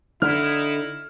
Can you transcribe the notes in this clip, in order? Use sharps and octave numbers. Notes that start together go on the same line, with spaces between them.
D3 D#4 E4 F6